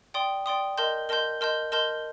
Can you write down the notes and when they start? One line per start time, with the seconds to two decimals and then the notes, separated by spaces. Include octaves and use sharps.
0.14 D5 G5 C6 D#6
0.46 D5 G5 C6 D#6
0.78 A#4 D#5 A5 C6 G6
1.09 A#4 D#5 A5 C6 G6
1.41 A#4 D#5 A5 C6 G6
1.72 A#4 D#5 A5 C6 G6